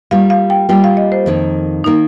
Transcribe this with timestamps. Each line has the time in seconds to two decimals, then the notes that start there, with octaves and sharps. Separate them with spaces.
0.11 G3 A#3 F4 F5
0.30 F5
0.50 G5
0.69 G3 A#3 F4 G5
0.84 F5
0.97 D#5
1.12 C5
1.26 F2 D#3 A#3
1.84 D#3 A#3 D#4